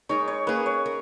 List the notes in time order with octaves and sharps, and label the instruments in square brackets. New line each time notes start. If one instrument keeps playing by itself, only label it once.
[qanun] G#3 D#4 A#4 [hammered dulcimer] C#5
[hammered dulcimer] C#5
[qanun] A#3 C#4 G#4 [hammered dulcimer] B4
[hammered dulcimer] C#5
[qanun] A#4